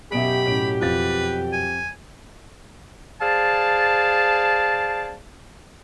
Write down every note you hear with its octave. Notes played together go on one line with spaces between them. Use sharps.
F#2 B2 G4 E5 B5 D7
A2 C#4 D7
F2 B4 F5 A6
G#5
G#4 C5 D5 F5 A5